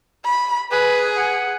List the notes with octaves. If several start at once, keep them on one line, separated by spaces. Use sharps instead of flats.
B5
G#4 B4
F#5